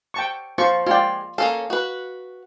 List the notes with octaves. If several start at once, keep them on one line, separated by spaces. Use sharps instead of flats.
G5 A5 C#6
F3 F4 C5 C#6
G#3 F4 D5 G5
A#3 C#4 A4 F5
F#4 B4